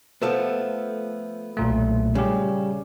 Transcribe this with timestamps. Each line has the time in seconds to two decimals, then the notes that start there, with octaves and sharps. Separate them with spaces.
0.22 F3 A3 B3
1.57 B1 A#2 A3
2.15 C#3 G3 G4